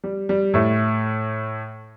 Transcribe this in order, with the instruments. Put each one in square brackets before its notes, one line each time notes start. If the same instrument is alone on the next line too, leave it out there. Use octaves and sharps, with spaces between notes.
[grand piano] G3
G3
A2 A3